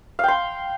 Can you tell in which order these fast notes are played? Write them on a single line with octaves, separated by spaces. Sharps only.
F5 G5 C6